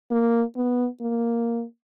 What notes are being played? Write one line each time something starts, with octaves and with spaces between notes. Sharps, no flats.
A#3
B3
A#3